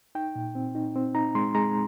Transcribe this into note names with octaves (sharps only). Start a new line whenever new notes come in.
D#4 G5
A#2
C4
D#4
C4
D#4 A#5
G#3 C6
G#3 A#5